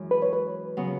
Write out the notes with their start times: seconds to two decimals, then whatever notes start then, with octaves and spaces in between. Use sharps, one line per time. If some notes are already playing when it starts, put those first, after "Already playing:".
Already playing: F#2 E3 G#3
0.11 B4
0.22 C#5
0.33 B4
0.77 C#3 F#3 B3